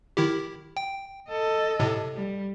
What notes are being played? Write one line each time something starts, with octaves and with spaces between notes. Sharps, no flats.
D#3 E4 G4
G5
A4 D#5
A2 C3
G3